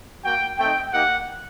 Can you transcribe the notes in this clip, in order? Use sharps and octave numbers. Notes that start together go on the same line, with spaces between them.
A#3 F#4 G5
A3 C4 D#4 G5
A#3 D#4 G4 F#5